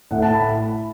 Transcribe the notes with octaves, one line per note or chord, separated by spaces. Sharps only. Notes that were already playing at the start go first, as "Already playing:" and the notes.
A2 A3 F#5
A5
B5